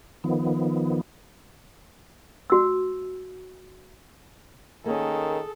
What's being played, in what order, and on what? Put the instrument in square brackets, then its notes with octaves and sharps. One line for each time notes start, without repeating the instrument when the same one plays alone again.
[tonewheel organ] D#3 F3 B3
[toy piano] F#4 E6
[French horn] D#3 [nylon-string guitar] A#3 C#4 [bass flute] G#4 [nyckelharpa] A4